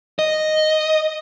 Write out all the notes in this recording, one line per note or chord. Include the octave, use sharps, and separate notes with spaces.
D#5